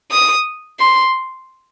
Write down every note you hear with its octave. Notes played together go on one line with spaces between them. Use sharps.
D#6
C6